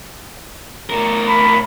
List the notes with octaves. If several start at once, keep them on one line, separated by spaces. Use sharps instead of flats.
A2 A#4
B5